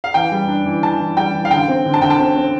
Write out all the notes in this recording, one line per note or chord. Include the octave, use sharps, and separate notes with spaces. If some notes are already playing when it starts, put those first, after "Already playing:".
F5
E3 G5
G3
D4
E3
E3 A5
E3
G3 G5
E3
F5
D3 G5
C4
D3
A5
D3 G5
A5
C4
C4